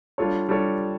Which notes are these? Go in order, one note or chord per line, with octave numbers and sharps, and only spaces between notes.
G3 D4 F4 A4 C#5
G3 D4 F4 A4 C#5